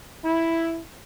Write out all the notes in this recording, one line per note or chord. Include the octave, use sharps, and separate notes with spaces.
E4